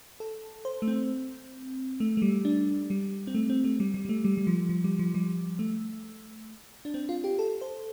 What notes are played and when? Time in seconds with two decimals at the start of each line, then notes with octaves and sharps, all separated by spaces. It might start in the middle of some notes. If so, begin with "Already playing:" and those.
0.20 A4
0.65 C5
0.82 A3
0.88 C4
2.00 A3
2.17 A3
2.22 G3
2.45 D4
2.90 G3
3.27 C4
3.35 A3
3.49 C4
3.64 A3
3.80 G3
3.94 G3
4.05 G3
4.09 A3
4.25 G3
4.37 G3
4.47 F3
4.69 F3
4.84 G3
4.99 F3
5.14 G3
5.59 A3
6.85 D4
6.94 C4
7.09 F4
7.24 G4
7.39 A4
7.61 C5